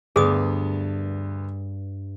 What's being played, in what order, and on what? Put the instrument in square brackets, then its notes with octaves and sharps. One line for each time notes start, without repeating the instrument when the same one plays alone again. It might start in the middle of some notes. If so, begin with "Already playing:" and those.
[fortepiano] D2 B3 [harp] G2 [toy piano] G#4 D#6